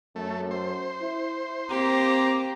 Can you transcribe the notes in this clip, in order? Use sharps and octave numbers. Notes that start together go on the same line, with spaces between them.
F#2 A3
C5
E4
A#3 C4 G4 A#5 D6